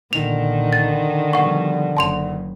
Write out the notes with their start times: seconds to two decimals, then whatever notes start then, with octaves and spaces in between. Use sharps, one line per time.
0.13 B1 A#2 D3 D#3 F7
0.73 A6
1.33 B2 F3 G3 F#5 C#6
1.97 F#1 F#2 C#3 A5 C6 F7